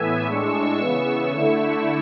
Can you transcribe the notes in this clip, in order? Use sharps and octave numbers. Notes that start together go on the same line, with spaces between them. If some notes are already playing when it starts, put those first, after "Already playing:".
Already playing: A2 E3 B3 E5 G#5
A2 G#3 D4 C#6 E6
C#3 E3 B3
D3 A3 E4